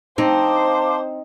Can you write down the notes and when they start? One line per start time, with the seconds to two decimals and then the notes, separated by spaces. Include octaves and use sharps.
0.18 C4 D#4 C5 F5 A5 D6